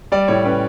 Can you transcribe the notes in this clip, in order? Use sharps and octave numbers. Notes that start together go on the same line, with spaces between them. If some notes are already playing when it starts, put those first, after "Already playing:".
G3 D5
A2 C#5
C#4 B4